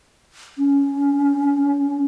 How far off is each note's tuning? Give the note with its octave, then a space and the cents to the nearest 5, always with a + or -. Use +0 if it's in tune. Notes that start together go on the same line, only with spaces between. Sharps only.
C#4 +15